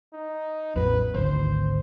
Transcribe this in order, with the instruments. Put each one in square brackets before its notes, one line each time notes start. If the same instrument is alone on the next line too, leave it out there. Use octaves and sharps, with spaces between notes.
[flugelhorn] D#4
[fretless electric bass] A1 E2 F#3 [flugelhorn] B4
[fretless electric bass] G#1 D2 [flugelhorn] C5